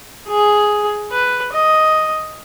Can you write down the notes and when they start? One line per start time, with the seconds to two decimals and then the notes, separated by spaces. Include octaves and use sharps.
0.28 G#4
1.11 B4
1.53 D#5